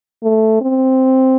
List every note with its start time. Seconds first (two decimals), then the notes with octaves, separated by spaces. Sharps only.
0.23 A3
0.61 C4